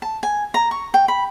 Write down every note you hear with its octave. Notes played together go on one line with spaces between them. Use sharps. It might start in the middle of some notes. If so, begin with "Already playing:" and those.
A5
G#5
A#5
C#6
G5
B5